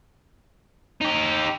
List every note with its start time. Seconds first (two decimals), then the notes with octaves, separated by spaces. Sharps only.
1.01 D#4 G4